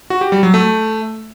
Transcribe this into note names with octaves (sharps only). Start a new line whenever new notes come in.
F#4
G4
G3
F#3
A3